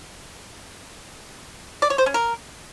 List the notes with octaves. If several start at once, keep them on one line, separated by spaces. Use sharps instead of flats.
D5
C#5
C5
C#4
A#4